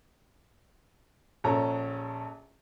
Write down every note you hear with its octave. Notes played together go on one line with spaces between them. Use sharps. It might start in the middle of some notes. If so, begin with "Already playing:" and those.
A#1 C#4 A4 C#5 A#5